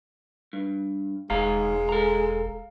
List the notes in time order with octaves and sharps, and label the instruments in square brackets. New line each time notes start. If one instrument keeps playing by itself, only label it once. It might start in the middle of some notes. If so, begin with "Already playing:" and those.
[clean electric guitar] G2
[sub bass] E1 [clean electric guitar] G#2 D#3 A#5 [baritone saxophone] G#3 [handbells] F5
[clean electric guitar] A4 A#5